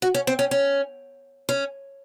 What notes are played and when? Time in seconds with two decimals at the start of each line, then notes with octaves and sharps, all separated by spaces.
0.02 F#4
0.14 C#4
0.27 C4
0.39 C#4
0.51 C#4
1.49 C#4